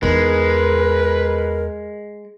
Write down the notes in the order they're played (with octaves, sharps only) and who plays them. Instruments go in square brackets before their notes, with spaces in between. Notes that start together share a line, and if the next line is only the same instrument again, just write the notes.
[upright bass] E2 D#4 [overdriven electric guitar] G#3 [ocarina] A#4 [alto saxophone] B4